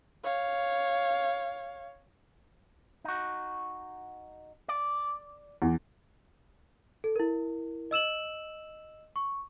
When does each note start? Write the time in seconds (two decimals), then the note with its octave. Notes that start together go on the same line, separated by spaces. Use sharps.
0.24 C#5 F5
3.04 D#4 F#4
4.68 D5
5.62 E2
7.04 A4
7.16 E4 A#4
7.91 D#5 E6 E7 F#7
9.16 C#6